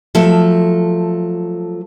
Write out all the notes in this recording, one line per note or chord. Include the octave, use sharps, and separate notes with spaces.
F3 F#3 A3 A4